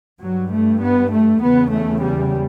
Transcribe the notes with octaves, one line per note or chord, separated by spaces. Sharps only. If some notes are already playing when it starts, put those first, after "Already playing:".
G2 F#3
A3
B3
A3
E2 C#3 B3
A3
G3